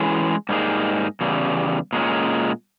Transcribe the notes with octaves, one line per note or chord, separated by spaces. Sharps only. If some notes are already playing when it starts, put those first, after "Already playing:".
Already playing: E3 G#3 C#4 G#4
G#2 G3 A#3 D#4 G#4
E2 C#3 G3
A#2 G#3 C#4